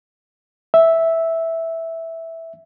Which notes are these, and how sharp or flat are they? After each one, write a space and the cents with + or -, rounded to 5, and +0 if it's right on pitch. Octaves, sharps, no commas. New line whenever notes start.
E5 -5